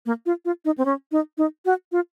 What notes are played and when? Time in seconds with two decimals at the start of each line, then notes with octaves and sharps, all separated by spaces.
0.06 A#3
0.26 F4
0.45 F4
0.65 D#4
0.78 C4
0.85 C#4
1.12 D#4
1.38 D#4
1.66 F#4
1.92 F4